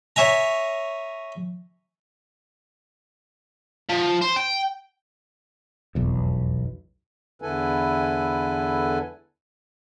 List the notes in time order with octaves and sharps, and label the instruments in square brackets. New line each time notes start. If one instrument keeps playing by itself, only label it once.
[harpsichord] C#5 E5 G#5 A#5
[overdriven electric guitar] F3
C5
G5
[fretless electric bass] F1 B1 E2
[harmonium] E2 D3 E4 A4 B4 G#5